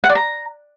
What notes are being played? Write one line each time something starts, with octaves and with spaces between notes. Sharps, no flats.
F#5
D5
A#5